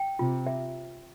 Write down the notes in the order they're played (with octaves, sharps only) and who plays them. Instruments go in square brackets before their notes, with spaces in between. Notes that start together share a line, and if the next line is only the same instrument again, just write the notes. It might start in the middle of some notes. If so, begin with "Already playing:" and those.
Already playing: [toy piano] G5
[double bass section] C3 [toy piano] F4
[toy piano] E5